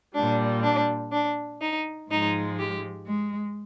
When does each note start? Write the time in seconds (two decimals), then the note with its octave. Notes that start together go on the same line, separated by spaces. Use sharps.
0.15 A#2 G3 D4
0.64 D4
1.12 D4
1.61 D#4
2.11 G#2 F3 G#3 D#4
2.59 G4
3.08 G#3